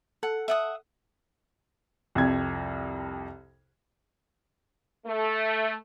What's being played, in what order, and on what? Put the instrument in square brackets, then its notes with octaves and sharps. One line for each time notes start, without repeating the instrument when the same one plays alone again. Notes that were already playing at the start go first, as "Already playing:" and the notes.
[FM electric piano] A4 [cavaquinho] F#5
[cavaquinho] E5 F#5 D#6
[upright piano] C2 F2 G#6
[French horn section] A3